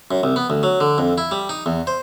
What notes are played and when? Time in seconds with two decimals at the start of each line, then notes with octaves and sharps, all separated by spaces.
0.11 F#2
0.23 C2
0.36 B3
0.50 D2
0.63 F#3
0.80 D3
0.98 F2
1.18 E4
1.31 G3
1.49 D#4
1.66 E2
1.87 C5